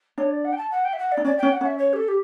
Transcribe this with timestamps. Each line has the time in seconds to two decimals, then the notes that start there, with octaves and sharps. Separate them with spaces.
0.18 D4 C#5
0.30 D5
0.45 F#5
0.52 G5
0.58 A5
0.71 F#5
0.85 G5
0.93 E5
0.99 F#5
1.12 D5
1.17 D4
1.25 C#4 D5
1.38 C#4 G5
1.52 F#5
1.61 C#4 E5
1.78 C#5
1.93 G4
1.96 A4
2.08 G4